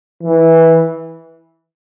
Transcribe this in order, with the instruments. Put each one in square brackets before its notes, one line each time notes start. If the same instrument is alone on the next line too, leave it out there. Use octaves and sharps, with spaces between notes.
[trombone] E3